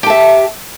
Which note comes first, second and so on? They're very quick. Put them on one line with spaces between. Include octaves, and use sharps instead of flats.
G4 A5 E5